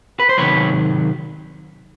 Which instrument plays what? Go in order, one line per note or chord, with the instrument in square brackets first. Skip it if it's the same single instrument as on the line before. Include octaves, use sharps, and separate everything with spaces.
[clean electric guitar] B4
C5
C3 D#3 F#3 B4 C#5